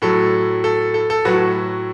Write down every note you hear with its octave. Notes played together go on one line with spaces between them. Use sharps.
A2 F#3 A4
A4
A4
A4
A2 F#3 F#4 B4